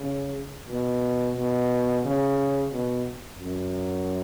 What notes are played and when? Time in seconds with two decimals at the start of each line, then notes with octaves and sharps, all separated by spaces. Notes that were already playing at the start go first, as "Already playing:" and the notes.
Already playing: C#3
0.68 B2
1.35 B2
2.03 C#3
2.72 B2
3.40 F#2